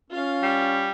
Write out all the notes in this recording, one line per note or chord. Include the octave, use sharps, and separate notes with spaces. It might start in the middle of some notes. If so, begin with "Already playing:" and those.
C#4 F4 F5
G3